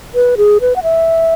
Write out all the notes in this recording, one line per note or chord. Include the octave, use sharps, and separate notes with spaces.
B4
G#4
B4
F#5
E5